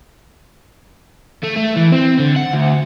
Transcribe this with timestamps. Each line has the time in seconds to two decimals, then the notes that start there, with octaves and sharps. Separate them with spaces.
1.44 A3
1.57 A3
1.77 E3
1.92 C4
2.19 D3
2.36 F#5
2.53 D2